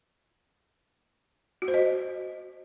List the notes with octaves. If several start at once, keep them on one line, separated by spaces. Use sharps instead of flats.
F#4
C5
D#5